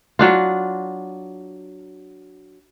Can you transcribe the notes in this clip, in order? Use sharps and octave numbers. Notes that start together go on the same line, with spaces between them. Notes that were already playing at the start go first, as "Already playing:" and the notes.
F#3 D4 F4